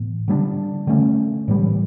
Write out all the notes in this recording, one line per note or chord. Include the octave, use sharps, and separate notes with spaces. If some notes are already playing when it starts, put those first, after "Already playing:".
Already playing: A2 E3 B3
D3 G3 B3 D4
D3 A3 C#4
A2 E3 G3